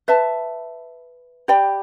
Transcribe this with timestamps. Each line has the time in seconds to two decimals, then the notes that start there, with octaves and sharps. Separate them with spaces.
0.08 B4 E5 A5
1.48 G4 D5 G5 B5